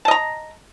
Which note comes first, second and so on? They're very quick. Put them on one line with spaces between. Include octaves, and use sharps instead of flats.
A5 D#5 A#5